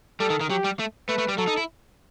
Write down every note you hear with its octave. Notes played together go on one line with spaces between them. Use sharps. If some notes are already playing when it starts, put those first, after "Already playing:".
G3 A4
D#3
D#3
F#3 G4
G3
A3
A3 B4
A3
G3
F#3 A4
D#4
E4